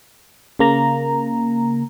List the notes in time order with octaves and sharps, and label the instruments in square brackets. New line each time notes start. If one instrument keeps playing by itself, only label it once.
[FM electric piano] C#3 A#3 A#5